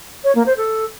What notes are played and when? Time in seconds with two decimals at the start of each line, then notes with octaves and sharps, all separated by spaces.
0.24 C#5
0.35 A#3
0.46 C5
0.57 A4